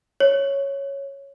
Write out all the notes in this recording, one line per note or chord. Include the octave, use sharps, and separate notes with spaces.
C#5